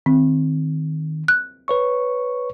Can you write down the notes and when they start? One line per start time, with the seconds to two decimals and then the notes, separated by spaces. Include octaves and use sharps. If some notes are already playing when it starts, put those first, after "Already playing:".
0.06 D#3 C4
1.28 F#6
1.68 B4 C#5 C#6